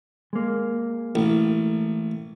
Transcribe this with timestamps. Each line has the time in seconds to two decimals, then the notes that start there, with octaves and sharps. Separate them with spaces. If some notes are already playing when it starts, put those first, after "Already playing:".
0.33 G#3 A#3
1.15 A1